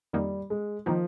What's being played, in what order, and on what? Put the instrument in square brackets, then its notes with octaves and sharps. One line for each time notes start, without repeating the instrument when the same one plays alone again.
[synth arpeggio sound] F2 D#3 A#3 D#4 [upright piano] G3
[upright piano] G#3
[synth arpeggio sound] D#3 A#3 D#4 [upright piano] F3